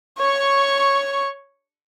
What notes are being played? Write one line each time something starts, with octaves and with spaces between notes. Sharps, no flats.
C#5 C#6